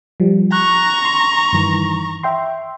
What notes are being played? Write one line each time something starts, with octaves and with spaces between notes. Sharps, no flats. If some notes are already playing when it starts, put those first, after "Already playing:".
F3 G3
A#5 C#6 F#6
C6
G2 D#3 E3
E5 G5 C6